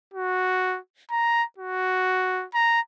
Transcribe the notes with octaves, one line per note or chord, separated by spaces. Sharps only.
F#4
A#5
F#4
A#5